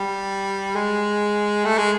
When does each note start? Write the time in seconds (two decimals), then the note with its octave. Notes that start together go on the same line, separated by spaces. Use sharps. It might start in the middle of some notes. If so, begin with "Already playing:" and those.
Already playing: G3
0.75 G#3
1.65 A3
1.78 G#3